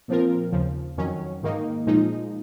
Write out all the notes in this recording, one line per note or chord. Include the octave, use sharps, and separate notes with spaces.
A#2 F3 C4 F4 A#4
D#2 C#3 F3
F2 D#3 F#3 C#4
G#2 D#3 A#3 D#4
A#2 F3 G#3 D#4